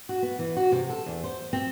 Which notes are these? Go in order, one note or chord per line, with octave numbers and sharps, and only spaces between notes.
F#4
B3
E3
F#4
C3
A4
E2
C5
C4